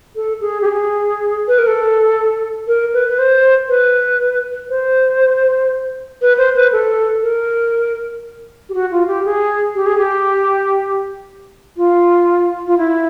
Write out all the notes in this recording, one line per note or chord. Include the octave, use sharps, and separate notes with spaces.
A4
G#4
G4
G#4
B4
A#4
A4
A#4
B4
B4
C5
B4
C5
B4
C5
B4
A4
A#4
G4
F#4
F4
G4
G#4
G4
G#4
G4
F4
F4
E4